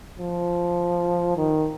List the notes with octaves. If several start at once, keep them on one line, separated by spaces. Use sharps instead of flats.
F3
D#3